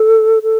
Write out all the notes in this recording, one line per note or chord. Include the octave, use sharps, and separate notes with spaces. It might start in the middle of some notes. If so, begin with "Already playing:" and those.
Already playing: A4
A4